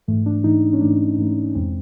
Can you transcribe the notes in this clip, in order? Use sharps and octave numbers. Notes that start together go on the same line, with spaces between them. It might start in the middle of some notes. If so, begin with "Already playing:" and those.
G#2 E3 A3
D4
G#2 E3 A3 D#4
C#4
G#2 E3 A3 D4
G#2 E3 A3
F2 C3 E3 G#3 C4